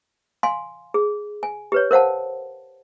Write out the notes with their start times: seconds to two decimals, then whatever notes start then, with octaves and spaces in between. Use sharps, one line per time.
0.43 F5 G#5 C6
0.94 G#4
1.43 G#5
1.72 G4 B4 C#5
1.91 A#4 C5 F5 F#5 A5